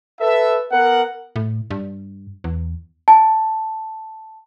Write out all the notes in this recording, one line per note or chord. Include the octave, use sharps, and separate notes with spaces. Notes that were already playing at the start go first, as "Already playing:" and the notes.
A4 B4 E5
B3 A#4 F#5
A2
G2
E2
A5